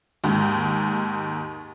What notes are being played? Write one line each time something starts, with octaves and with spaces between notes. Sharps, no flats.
D#2 G#2